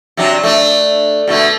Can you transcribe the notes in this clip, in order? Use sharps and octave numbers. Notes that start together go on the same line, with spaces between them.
C3 F#3 D4
A3 D4
B2 D3 A3